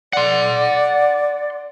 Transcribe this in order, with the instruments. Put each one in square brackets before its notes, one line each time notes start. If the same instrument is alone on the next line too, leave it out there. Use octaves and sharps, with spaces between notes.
[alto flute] D5 [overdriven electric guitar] F#5 C6